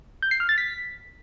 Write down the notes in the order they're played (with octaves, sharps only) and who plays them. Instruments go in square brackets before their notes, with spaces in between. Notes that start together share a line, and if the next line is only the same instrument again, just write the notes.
[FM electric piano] G6
C7
F6
A6
B6